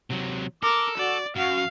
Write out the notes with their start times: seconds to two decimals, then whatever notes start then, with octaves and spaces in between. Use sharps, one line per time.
0.10 C3 F#3
0.62 A4 A#4 D6
0.98 F#4 D5
1.37 F#2 F#4 F5